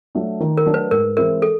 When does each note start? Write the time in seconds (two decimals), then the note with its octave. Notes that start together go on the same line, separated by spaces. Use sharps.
0.15 F#3 A3 D4
0.40 D#3
0.57 A#4
0.66 F#3 A3 D4
0.74 B4
0.91 G#2 A#4
1.17 E3 G#3 C4 E4 A#4
1.42 A4